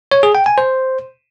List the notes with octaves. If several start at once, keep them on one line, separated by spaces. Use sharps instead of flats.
C#5
G#4
G5
G#5
C5